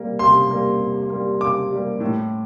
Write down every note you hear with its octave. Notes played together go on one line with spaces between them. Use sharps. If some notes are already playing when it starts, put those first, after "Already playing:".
Already playing: C3 G3 A#3
C3 C6
G3 A#3
C3
G3 A#3
C3 D6
G3 A#3
A2